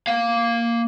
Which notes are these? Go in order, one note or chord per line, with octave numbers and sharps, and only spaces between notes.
A#3 F5